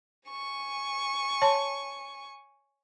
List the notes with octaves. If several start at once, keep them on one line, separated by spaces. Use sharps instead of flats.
G#5 C#6
C#5 A5 C6